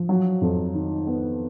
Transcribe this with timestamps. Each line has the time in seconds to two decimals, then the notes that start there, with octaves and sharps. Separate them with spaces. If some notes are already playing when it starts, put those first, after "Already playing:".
Already playing: F3
0.09 F#3
0.41 F2
0.74 D#3
1.07 B3